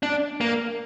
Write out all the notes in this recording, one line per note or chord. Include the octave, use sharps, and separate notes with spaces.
D4
A#3